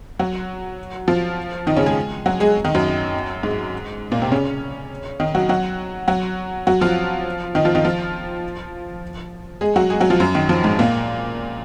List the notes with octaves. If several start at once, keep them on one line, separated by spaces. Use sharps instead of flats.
F#3 F#4
F3 F4
D#3 D#4
C#3 C#4
G#3 G#4
F#3 F#4
G#3 G#4
D#3 D#4
F#2 F#3
G#2 G#3
A#2 A#3
C3 C4
C#3 C#4
D#3 D#4
F#3 F#4
F#3 F#4
F#3 F#4
F#3 F#4
F3 F4
D#3 D#4
F3 F4
D#3 D#4
F3 F4
G#3 G#4
F#3 F#4
G#3 G#4
F#3 F#4
F3 F4
F#2 F#3
D#3
F3
G#2 G#3
A#2 A#3